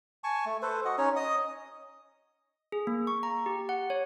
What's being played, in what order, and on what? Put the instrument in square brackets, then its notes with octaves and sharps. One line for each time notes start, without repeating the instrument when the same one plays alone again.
[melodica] G#5 A5 C#6
A3
A4 B4 C5
F#4 D#5 F#5
C#4 D#4 C#5
D#5 D#6
[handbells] G#4
A#3
C#6
A#5
G4
F#5
C#5